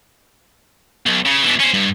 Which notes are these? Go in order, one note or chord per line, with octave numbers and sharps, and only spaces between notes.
B1
C#3
B2 E3
C#4 C5
G2